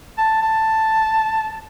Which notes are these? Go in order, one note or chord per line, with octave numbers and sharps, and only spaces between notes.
A5
A5